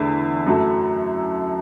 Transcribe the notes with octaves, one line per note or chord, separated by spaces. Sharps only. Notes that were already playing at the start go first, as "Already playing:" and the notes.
Already playing: E2 D3 A3 E4
F#2 F#3 A3